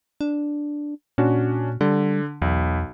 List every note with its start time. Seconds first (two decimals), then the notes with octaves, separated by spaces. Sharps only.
0.21 D4
1.18 A#2 C#4 D4 F#4
1.81 D3 G3
2.42 B1 E2